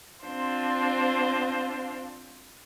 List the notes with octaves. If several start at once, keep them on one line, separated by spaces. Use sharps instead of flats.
C4 D4 F4 C5